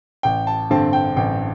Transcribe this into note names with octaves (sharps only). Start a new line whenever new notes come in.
A1 G5
A5
G2 D3 C4 A5
G5
A1 G5